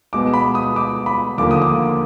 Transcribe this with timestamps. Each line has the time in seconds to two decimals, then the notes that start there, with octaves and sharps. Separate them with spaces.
0.13 B2 G#3 B3 D6
0.34 B5
0.55 D#6
0.76 D6
1.06 B5
1.38 D#2 D3 F3 A#3 D6
1.51 D#6
1.62 D6